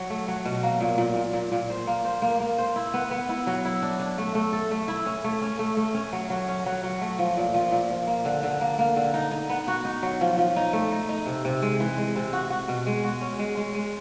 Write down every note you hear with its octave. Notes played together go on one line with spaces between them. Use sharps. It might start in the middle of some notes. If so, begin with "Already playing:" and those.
Already playing: F#3
A3
F#3
B2
A#3
A#2
A#2
A#2
A#2
A#2
C5
A#3
C5
A#3
A#3
C5
E4
B3
B3
E4
F#3
E4
D4
D4
A3
A3
A4
A3
E4
C#4
A3
C#4
A3
A3
C#4
F#3
F#3
C#4
F#3
F#3
A3
F3
A#2
F3
A#2
F3
A#3
D3
D3
A#3
A#3
D3
D#4
D#4
B3
F#4
D#4
F#3
F3
F3
D#4
A3
D#4
D#4
C3
C3
G#3
E3
G#3
C3
F#4
F#4
B2
G#3
F#4
C#4
G#3
G#3
G#3